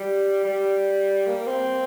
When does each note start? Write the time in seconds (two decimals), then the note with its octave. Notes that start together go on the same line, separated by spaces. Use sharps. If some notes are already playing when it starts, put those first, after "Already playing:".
Already playing: G3
0.44 G3
1.27 A#3
1.47 C4